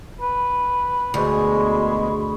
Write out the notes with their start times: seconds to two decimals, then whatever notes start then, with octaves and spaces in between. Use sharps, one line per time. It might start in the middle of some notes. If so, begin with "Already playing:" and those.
0.21 B4
1.14 D2 B2 G#3 G#4 B5 C#6